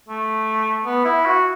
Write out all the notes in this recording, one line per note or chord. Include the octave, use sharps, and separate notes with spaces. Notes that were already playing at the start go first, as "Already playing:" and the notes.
A3
B3
E4
F#4